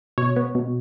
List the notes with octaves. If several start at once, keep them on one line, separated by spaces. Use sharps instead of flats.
B2 C#5
B3
B2